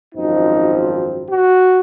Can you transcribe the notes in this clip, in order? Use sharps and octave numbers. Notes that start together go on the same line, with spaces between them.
G#1 F#2 F3 C4 D#4
F#4